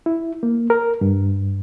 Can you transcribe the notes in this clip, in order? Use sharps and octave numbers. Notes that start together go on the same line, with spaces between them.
E4
A#3
A#4
G2